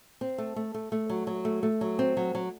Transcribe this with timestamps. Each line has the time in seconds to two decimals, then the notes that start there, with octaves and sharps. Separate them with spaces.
0.21 C4
0.38 A3
0.56 A3
0.74 A3
0.92 A3
1.10 F#3
1.27 F#3
1.45 A3
1.63 A3
1.81 F#3
1.99 C4
2.17 F#3
2.35 F#3